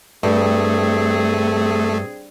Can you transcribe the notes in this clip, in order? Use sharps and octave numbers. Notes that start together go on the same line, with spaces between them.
G2 A3 C4 G#4